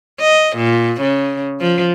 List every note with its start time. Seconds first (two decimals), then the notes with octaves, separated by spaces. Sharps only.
0.21 D#5
0.57 A#2
1.01 C#3
1.61 F3